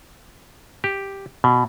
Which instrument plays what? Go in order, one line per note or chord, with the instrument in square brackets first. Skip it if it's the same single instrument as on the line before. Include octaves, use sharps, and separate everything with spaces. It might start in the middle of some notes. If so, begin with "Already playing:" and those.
[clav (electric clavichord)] G4
B2